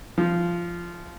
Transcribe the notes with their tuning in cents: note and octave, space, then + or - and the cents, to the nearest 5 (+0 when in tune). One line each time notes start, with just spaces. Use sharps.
F3 -15